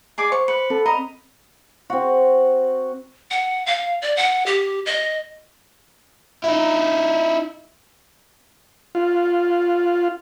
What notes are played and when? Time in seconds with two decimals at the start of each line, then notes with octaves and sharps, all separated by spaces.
0.18 G#4 D5 D6
0.32 C5 C#6
0.48 B4 C#7
0.70 C4 A4
0.86 D#5 A#5 B5
1.90 C4 F#4
3.31 F#5
3.66 F5
4.02 D5
4.16 F#5
4.46 G4
4.86 D#5
6.44 D#4 E4
8.95 F4